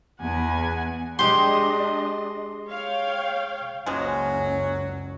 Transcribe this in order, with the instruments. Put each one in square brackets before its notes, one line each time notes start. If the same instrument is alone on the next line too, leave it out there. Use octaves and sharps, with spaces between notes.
[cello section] E2 [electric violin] F#5 G#5
[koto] G#3 G4 [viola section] D4 D#5 [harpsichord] C6
[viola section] C#5 F5 G5
[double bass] F#1 C#2 [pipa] F3 G#3 [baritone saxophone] F#3 [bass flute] C#4